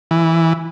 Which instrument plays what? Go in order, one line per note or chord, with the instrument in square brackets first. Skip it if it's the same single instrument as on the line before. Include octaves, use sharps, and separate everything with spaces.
[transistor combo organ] E3